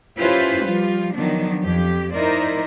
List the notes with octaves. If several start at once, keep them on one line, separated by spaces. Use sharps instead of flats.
C#4 E4 F4 G4 B4 C5
F3 G3 F4
D#3 F3 F#3 B3 D4
F2 G4
D#4 E4 A#4 C5 D5